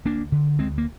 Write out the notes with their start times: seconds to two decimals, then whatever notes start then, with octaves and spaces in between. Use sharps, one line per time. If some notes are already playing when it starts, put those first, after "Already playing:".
0.05 D2 A#3 D4
0.32 D3
0.59 D2 G#3 C4
0.78 A#3